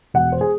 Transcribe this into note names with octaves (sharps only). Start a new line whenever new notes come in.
E1 F#5
C5
G#4